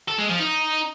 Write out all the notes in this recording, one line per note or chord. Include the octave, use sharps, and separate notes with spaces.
A4
G#3
F3
D#4